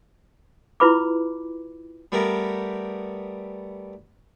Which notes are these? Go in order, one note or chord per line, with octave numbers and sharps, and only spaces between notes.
E4 F4 B4 B5 D6
G3 A3 B3 G4 A#4